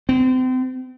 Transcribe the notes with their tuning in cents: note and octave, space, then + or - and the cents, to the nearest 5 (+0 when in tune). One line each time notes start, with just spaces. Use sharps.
C4 -35